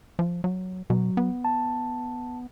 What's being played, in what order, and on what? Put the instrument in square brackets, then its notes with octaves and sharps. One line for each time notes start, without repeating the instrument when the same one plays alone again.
[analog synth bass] F3
F#3
[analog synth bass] B2 [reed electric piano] F#3
[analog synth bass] B3
[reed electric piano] A5